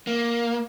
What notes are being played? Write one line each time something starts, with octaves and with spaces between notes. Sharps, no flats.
A#3